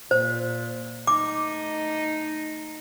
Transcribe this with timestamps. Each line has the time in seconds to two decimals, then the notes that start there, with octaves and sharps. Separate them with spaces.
0.11 A#2 C5
1.07 A3 D#4 D6